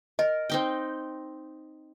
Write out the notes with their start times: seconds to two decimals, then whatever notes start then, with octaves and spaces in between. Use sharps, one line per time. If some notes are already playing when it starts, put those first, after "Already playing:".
0.19 A#4 D#5
0.50 C4 D#4 G5